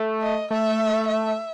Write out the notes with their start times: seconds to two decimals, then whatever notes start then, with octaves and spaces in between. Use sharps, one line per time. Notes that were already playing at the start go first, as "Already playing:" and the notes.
Already playing: A3
0.22 D#5
0.51 A3 E5
1.08 E5